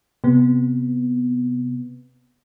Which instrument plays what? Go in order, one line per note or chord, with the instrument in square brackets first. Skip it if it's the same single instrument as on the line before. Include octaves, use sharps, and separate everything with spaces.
[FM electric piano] C3 B3